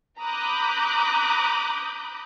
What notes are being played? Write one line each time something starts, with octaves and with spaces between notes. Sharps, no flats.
A#5 B5 D6 D#6 F#6 G6